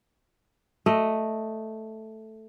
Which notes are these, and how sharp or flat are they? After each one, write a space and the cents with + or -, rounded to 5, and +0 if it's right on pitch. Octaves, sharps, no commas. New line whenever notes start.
A3 +0 D#5 +0